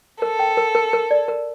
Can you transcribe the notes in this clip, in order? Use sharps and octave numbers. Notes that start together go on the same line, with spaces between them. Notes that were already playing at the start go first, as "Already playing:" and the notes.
A4 A#4
G5
A#4
A#4
A#4
D5
A#4